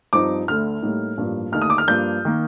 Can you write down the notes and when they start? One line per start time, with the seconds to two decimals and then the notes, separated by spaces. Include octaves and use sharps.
0.13 G2 F3 C4 D#4 D6
0.48 D2 D3 A3 F6
0.82 A2 G3 A#3 D#4
1.17 A1 G2 F3 A#3 D4
1.52 D#2 D3 A3 D#4 F6
1.62 D#6
1.70 D6
1.78 F6
1.87 G2 F3 A#3 D4 G6
2.25 D#3 A#3